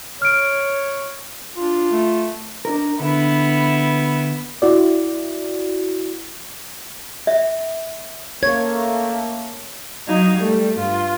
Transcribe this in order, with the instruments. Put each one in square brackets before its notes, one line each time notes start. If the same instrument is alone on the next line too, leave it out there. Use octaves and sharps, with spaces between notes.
[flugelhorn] C#5 [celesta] F6 D7
[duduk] D4 [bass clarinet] F4
[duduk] A3
[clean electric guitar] D4 D#4 A#4
[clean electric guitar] D3 [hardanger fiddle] B3 E4
[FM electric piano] E4 F#4 D5
[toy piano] E5
[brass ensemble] A3 A#3 [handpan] C#5 [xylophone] G#6
[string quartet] F#3 D#4 F5 G#6
G3 A3
G2 F4